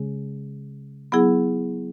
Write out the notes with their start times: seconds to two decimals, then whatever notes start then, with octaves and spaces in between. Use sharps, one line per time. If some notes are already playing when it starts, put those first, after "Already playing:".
Already playing: C#3 G#3 C#4 G#4
1.12 F#3 B3 E4 G#4